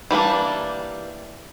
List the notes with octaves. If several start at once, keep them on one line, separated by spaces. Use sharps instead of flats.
E3 G3 A#3 D4